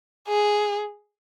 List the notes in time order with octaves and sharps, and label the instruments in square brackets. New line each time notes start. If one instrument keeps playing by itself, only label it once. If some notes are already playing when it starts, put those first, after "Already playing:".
[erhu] G#4